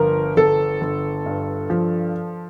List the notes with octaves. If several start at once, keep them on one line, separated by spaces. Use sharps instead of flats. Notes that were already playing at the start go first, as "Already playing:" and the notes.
Already playing: G1 F3 A#4
G1 A4
G1
G2
F3